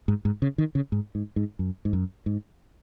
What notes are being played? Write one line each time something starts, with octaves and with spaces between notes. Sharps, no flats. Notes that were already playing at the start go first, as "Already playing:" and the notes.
G#2
G#2
C#3
D#3
C#3
G#2
G#2
G#2
F#2
G#2
F#2
G#2